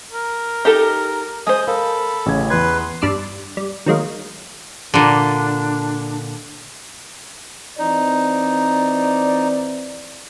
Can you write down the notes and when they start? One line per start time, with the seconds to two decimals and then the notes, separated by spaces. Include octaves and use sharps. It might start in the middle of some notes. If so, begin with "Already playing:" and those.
0.12 A#4
0.65 D#4 G4 A4
1.47 G#3 C5 D#6
1.68 A4 A#4 F5 B5
2.26 A1 C#3 G#6
2.50 E2 B4 C6 G#6
3.01 G2 G3 D4 D6 E6 C7
3.57 G3
3.86 D#3 F#3 G#3 A#3
4.94 A#2 D3 D4
7.79 E3 C4 D#4 D5